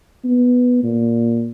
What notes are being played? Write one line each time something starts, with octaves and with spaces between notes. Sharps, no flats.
B3
A#2